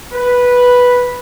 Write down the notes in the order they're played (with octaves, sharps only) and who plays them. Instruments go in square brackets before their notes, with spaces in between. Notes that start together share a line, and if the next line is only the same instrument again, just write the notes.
[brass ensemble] B4